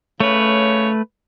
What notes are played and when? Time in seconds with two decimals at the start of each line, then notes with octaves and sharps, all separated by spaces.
0.20 C#3 A3 C#4 B4 C#5